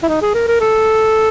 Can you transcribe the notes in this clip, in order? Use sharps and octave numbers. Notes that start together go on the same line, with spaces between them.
E4
D#4
G#4
A#4
A#4
A4